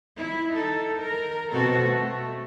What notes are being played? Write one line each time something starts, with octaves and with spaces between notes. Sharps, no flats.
E4
D#4 A4
A#4
B2 C4 F#4 A4
A3